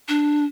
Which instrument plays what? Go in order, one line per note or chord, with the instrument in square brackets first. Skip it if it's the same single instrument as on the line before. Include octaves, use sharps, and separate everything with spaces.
[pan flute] D4